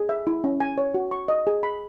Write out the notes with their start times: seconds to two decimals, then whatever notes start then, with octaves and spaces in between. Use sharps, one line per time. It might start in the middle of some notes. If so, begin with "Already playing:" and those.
Already playing: G#4
0.09 E5
0.27 E4
0.44 C#4
0.60 G#5
0.78 C#5
0.94 F#4
1.11 C#6
1.28 D#5
1.47 G#4
1.63 B5